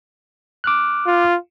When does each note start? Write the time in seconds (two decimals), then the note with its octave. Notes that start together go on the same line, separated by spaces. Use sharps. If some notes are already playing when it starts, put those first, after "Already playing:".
0.64 D6 F6 F#6
1.07 F4